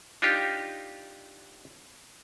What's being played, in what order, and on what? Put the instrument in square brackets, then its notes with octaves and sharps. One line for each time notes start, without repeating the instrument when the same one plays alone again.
[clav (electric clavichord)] D4 D#4 F4 G4